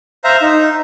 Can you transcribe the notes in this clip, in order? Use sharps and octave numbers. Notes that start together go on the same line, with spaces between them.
C5 E5 F5 A#5
D#4